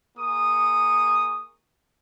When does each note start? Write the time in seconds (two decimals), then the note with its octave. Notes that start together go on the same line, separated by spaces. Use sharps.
0.17 A#3 G#4 C#6 D#6